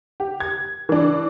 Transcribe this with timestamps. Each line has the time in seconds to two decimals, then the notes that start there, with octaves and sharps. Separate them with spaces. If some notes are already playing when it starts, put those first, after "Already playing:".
0.20 G4
0.40 G#6
0.89 E3 D4